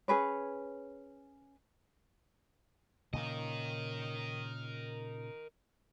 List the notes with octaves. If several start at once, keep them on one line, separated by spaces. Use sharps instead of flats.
C#4 G#4 B4 C#5
A#2 C#3 A#4 D#5